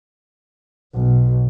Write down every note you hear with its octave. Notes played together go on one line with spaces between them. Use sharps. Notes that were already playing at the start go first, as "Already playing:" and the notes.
B1